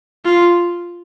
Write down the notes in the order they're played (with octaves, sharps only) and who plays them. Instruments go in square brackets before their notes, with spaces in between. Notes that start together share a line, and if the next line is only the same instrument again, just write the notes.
[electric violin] F4